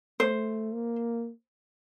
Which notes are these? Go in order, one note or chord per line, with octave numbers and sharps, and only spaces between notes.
A3 C5
A#3